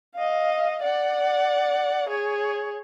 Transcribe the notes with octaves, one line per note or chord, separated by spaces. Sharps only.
D#5 F5
D5 F#5
G#4 C#5